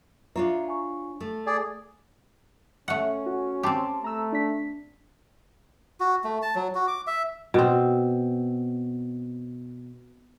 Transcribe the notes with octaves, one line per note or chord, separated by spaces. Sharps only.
D4 F4 C#5 E5 A#5
G#5 C#6
A3 A4
G#4 D5
A3 C#4 F#5
F#4
C4 G4 A5 C6 D6
A3 A#5 E6
D4 B6
F#4
A3
A5
F#3
F#4
D6
E5
B2 C4